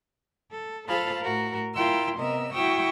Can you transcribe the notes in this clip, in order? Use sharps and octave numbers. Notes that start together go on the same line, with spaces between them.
A4
F4 A4 C5 F5 A5 B5
A2 F#4 A#4
E4 F4 A#4 G5 C6 E6
C3 B3 A#4 D#5 E6
E4 F#4 G5 C#6 D#6 E6